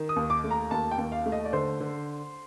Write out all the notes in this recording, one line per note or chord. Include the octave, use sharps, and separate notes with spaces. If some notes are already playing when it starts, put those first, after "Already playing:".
Already playing: D#3
D#6
D#2
D6
A3
A#5
D#2 A5
G5
D#2
F5
A3
D#5
D5
D3 C5
D3